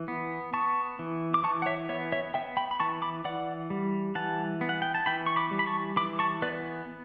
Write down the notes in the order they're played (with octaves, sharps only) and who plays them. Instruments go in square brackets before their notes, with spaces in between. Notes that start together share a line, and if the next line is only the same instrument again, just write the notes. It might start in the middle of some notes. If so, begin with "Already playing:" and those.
Already playing: [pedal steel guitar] E3
B3
B3 A5 C#6
E3
D6
E3 A5 C#6
F#5
C#5 E5
B3 C#5 E5
C#5 E5
B3 E5 G5
G5 B5
B5
E3 A5 C#6
B5 D6
E3 D5 F#5
G3
E3 F#5 A5
B3
F#5
G5
A5
E3 G5 B5
C#6
B5 D6
G3
B5
A5 C#6
E3 B5 D6
A5 C#6
B3 B4 D5